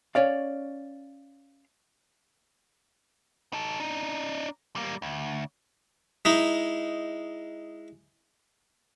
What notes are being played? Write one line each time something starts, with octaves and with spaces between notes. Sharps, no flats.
C#4 C#5 D5 F5
D#4 A4
D4 D#4
G3 A#3
D2
G#3 D#4 E4